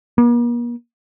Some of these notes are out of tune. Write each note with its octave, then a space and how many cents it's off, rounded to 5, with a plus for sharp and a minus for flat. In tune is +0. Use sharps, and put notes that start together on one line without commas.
A#3 +45